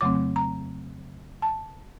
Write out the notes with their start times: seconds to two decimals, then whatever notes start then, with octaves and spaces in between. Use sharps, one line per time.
0.01 F2 C#3 F#3 A3 C4 D6
0.36 A#5
1.42 A5